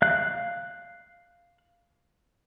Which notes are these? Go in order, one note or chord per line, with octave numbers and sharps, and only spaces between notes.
F5 F#6